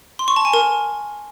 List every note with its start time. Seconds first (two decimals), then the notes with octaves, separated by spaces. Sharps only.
0.19 C6
0.28 C#6
0.36 A5
0.45 G#5
0.53 A#4